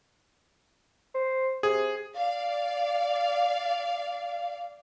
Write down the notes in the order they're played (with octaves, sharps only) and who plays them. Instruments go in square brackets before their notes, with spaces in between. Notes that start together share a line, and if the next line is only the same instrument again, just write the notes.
[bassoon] C5
[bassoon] C3 [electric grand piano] G#4
[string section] D5 F5